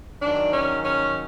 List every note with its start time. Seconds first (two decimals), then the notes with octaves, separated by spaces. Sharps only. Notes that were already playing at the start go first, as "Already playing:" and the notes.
0.22 G#2 D#3 F#3 D4
0.53 C#4
0.85 C#4